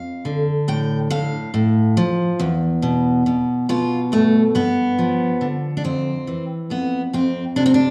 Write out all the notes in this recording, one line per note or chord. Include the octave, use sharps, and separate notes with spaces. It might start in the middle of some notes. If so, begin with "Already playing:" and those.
Already playing: F2 F5
D3
A2 G5
A2 F5
A2
F3
E2
B2
B2
B2 F4
G2 A3
G2 B3
F3
D3
D4
F2 C4
E3
F2 B3
F2 C4
C3 D4
C4
D4